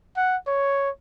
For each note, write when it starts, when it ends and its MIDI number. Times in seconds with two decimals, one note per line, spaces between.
0.17 0.37 78
0.47 0.90 73